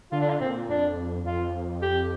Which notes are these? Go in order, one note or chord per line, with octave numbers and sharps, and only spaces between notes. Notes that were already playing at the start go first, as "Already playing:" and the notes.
D3 F4
D4
F4
A#2 C4
F2 D4
F2 F4
G4